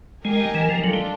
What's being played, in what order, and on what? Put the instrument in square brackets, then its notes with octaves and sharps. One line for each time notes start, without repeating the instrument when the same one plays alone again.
[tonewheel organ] G#3 [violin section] D#4 G4 A#4 D#5 G#5
[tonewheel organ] E3
F3
[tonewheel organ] F#3 [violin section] D4 F4 A4
[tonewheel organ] G3